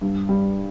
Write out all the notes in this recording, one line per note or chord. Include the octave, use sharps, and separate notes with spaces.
G2
G3